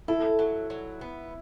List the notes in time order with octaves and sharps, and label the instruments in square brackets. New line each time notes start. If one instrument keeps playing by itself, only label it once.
[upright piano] E4 [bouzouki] A4
[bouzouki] F#3
F#3
B3